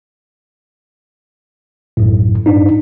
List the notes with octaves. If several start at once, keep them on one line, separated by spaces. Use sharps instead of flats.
B1 F#2 A2
G2 D4 D#4